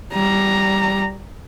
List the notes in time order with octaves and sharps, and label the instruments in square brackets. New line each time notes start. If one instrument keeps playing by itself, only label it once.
[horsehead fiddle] G3 A#5